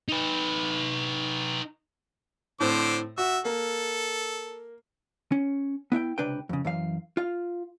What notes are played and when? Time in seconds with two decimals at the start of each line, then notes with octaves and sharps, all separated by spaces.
0.08 D#4 B4
2.60 A2 D3 C4 C5 D6
3.18 F#4 E5
3.45 A#3 A4
5.32 C#4
5.92 B3 E4 E5 G5
6.18 C#2 C3 D4 B4 G5
6.49 F2 C#3
6.65 F#2 E3 F5
7.17 F4 F5